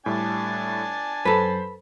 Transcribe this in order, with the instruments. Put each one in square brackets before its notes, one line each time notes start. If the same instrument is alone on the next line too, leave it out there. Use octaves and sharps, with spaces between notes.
[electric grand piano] A2 G3 A3 [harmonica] D4 G#5 A5
[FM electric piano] F#2 [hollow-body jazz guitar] A4 B4 [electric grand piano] C5 B5